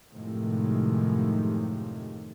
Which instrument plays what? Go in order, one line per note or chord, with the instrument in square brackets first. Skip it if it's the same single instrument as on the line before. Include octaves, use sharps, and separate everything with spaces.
[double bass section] F#2 A2 C3 D#3 F3 G#3